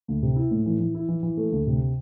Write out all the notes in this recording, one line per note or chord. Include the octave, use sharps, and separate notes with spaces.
D2
C3
E4
A2
E3
E3
E4
E3
E3
A3
D2
C3